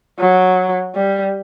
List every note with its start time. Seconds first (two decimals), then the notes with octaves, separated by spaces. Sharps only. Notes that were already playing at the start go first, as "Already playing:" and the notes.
0.19 F#3
0.95 G3